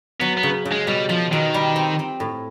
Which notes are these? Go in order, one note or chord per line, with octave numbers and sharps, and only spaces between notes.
F#3 B3
B3
C#3
C#3
G#3
B2 G3
F3 F4
B2 D#3
G3
C4
C4
A2